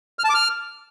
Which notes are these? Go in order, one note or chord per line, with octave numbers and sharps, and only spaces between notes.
F6
A5
D6
F6